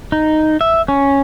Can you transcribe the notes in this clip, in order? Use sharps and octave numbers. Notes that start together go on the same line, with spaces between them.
D#4
E5
C#4